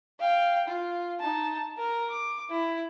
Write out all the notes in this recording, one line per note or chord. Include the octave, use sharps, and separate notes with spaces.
F5 G5
F4
D#4 A5
A#4 A#5
D6
E4